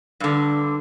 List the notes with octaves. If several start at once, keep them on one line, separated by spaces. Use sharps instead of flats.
G2 D3